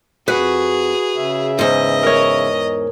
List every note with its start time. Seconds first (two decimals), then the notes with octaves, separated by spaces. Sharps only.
0.28 F2 F#4 G#4 B4
1.16 C#3 E5
1.59 E2 G#2 D#5
2.03 A#4 C#5